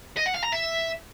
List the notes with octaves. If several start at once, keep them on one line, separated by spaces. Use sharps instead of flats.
D#5
F#5
F5
A#5
E5